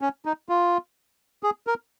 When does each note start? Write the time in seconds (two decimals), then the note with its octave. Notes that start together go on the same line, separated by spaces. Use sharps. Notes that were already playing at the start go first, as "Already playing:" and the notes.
0.01 C#4
0.25 D#4
0.49 F4
1.43 G#4
1.67 A#4